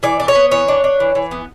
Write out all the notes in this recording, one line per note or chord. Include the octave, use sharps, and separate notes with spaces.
E3 D5
D4
C#5
B3
E3 C#5
D4
D4
E3
E3
B3